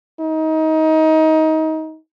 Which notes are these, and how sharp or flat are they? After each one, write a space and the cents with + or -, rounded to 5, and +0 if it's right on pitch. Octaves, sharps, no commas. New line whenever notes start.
D#4 +25